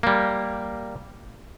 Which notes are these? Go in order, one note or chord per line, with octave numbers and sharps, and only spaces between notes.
G3 A#3